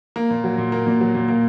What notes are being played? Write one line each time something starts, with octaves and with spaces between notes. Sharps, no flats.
A#3
A#2
F#3
A#2
A#3
A#2
F#3
A#2
A#3